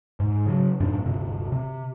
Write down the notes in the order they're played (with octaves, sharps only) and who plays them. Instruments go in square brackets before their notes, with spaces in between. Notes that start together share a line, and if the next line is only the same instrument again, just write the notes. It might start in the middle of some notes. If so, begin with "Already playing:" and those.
[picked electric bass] G#2
C#3 E3 F#3
F#2 A2 C3 D4
D1 G1 C3
C3